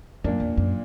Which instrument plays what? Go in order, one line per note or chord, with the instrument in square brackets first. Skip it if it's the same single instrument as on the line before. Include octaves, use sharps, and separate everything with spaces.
[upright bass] F#2 [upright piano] A#2 A#3 D4
[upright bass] E2
F#2